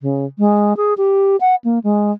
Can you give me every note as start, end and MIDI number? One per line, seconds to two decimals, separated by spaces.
0.02 0.25 49
0.39 0.76 56
0.77 0.94 68
0.98 1.36 67
1.41 1.55 78
1.64 1.79 58
1.84 2.12 56